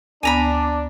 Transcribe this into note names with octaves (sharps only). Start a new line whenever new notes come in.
D2 B3 D4 G#5 A#5 B5